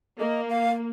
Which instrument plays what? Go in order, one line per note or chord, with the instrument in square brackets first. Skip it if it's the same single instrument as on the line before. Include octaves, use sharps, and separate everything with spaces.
[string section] A#3 [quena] D#5
[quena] F5